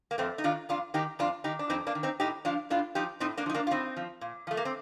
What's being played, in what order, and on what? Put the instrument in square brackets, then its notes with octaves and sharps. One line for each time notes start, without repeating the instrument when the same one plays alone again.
[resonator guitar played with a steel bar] A#3
F2 A3 C4
D#4
D#3 D4 F4
F2 D4 F4
D#3 D#4 G4
F2 D4 F4
D#3 D#4 G4
D4
F2 C4 D#4
A#3 D4
D#3
C4 D#4
A2 D#4 G4
F3 D4 F4
A2 D4 F4
F3 D#4 G4
A2 C4 D#4
A#3 D4
F3 D#4
A#3 D4
F4
A2 C4 D#4
F3
A#2
F3 A3
A#3
C4